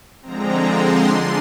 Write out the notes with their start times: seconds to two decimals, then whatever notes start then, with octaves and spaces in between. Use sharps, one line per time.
0.22 D3 F3 G#3 C4 A#5
0.65 C6
1.07 D3 G#3 D4 F4 C6